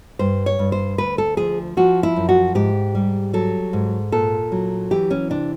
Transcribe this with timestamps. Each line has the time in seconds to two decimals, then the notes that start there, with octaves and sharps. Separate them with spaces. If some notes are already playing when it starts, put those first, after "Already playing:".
0.19 G2 C5
0.46 C#5
0.59 G2
0.72 C5
0.98 D2 B4
1.18 A4
1.37 F3 G#4
1.77 F3 F#4
2.03 E4
2.16 F#2
2.29 F#4
2.55 G#2 G4
2.95 G3
3.33 F#3 A4
3.73 G#2
4.12 A#2 A4
4.52 F#3
4.91 E3 G4
5.11 C#4
5.30 C3 D4